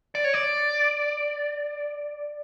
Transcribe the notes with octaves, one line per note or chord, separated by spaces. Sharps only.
D5
C#5
D5